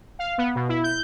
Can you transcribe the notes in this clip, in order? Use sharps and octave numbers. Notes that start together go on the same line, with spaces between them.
F5
B3
B2
E4
G6